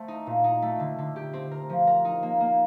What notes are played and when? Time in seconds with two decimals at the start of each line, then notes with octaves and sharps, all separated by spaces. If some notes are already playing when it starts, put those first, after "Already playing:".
Already playing: A3 C4
0.08 D#4
0.27 A#2
0.44 D#4
0.62 A3
0.80 D3
0.98 D3
1.16 G4
1.33 C4
1.51 A#4
1.69 F3
1.87 A#4
2.05 D#4
2.23 A#3
2.41 A#3